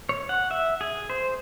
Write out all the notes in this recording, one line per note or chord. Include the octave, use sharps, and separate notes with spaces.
C#5
F#5
E5
G#4
C5